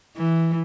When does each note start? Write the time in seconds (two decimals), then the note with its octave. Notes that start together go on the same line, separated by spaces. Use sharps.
0.17 E3